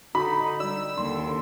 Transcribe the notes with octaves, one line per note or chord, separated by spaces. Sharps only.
D3 D#4 F#4 B5
G3 D5 E6
D#2 D3 C6